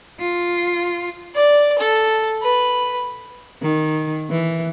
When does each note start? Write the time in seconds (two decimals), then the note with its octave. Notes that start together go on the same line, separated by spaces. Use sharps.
0.20 F4
1.35 D5
1.78 A4
2.42 B4
3.62 D#3
4.30 E3